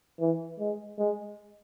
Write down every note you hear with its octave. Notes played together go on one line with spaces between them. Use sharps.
E3
G#3
G#3